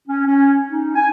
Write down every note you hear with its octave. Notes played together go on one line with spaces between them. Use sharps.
C#4
C#4
D#4
G#5